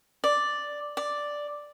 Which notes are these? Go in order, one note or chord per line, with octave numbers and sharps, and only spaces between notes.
D5
D5